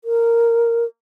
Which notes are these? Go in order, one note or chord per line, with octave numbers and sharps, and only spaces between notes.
A#4